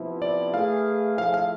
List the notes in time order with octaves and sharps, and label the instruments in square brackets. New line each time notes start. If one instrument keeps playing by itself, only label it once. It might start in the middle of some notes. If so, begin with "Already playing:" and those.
Already playing: [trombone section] C3 F3 B3 E4 B4
[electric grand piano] D5
[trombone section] A3 E4 G#4 B4 [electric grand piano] F5
[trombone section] F3 A3 E4 G#4 [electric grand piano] F5
[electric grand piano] F5